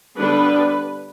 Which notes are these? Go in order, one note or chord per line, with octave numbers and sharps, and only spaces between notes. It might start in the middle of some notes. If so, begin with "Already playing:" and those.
D3 G3 B3 D4 B4